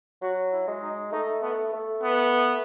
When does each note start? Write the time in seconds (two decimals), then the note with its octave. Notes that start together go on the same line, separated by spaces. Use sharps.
0.22 F#3 F#4
0.52 E4
0.67 G#3
0.82 D#4
1.12 A3 D#4
1.42 A3 B3
1.73 A3
2.02 B3